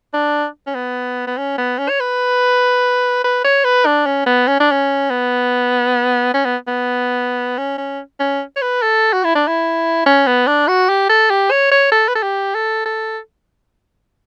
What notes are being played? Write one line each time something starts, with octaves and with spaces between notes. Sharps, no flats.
D4
C#4
B3
B3
C#4
B3
C#4
C#5
B4
B4
C#5
B4
D4
C#4
B3
C#4
D4
C#4
B3
C#4
B3
B3
C#4
C#4
C#4
C#5
B4
A4
F#4
E4
D4
E4
C#4
B3
D4
F#4
G4
A4
G4
C#5
C#5
A4
B4
A4
G4
A4
A4